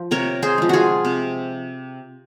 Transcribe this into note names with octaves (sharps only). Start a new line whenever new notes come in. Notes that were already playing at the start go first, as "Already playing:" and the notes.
Already playing: F3
C3 A#4 C#5
G#4 C5
F3 G#3
F4 F#4 G#4
C3